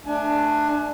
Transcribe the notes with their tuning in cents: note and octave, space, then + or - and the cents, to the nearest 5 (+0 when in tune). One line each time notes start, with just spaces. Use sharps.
A3 +0 D4 +15 G#5 +40